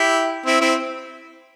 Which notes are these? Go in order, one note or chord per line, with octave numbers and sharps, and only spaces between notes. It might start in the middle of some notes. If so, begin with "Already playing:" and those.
Already playing: E4 G4
C4 E4
C4 E4